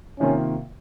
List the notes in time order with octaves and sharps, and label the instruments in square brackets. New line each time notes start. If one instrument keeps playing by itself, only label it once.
[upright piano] C3 D#3 A#3 F4 [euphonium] C#4